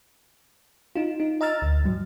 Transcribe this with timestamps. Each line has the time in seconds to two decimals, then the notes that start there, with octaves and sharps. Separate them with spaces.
0.96 D#4 F4
1.20 D#4
1.41 D#5 A#5 E6 F6 A6
1.62 D2
1.84 G#2 F#3